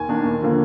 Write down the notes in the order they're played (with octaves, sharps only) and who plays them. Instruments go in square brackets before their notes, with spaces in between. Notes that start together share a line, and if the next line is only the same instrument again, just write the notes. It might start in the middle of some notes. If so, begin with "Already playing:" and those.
Already playing: [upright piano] D#2 G#5
D#3 A#3 D4
D#2
D3 F3 A#3